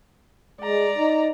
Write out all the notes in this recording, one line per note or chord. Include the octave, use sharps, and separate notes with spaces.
G#3 D5 A#5
D#4